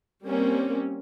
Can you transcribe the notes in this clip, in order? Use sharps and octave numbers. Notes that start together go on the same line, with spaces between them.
G3 A#3 C4 C#4